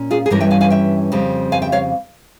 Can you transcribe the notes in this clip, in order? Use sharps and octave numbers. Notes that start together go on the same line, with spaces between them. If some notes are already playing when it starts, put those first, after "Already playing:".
Already playing: A#2 C#4
F4 G#4
G#4
G2 E3 G3 C#4 G4 A#4
E5 G5
F5 G#5
F5 G#5
E5 G5
F2 C#3 G3 C4
F5 G#5
E5 G5
C#5 F5